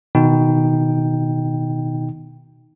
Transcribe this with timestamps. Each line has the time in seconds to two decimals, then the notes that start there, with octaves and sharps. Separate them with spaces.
0.15 B2 D#3 D#4 G5